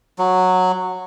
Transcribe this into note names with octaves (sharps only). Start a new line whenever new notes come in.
F#3